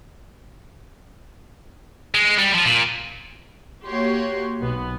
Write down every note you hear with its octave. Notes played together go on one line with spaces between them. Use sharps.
G#3
G3
F3
A#2
A#3 F#4 G4 C#5 C6
B1 B3